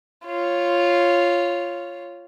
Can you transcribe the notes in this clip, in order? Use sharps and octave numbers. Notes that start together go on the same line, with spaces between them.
F4 C#5